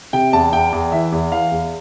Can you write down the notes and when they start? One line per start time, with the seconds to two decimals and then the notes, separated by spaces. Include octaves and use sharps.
0.13 C3 G5
0.33 E2 A5
0.53 E2 G5
0.72 E2
0.92 E3 E5
1.12 E2
1.32 E3 F5
1.51 E2